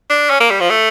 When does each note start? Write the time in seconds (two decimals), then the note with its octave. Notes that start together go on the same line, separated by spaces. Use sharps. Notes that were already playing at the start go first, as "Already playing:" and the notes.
0.10 D4
0.30 C#4
0.40 A#3
0.50 G3
0.60 F3
0.70 A3